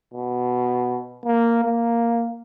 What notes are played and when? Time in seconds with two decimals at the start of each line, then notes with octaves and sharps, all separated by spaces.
0.14 B2
1.25 A#3
1.65 A#3